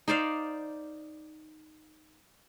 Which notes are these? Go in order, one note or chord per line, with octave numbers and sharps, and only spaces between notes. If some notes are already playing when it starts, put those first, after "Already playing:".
D#4 C5 D5 F5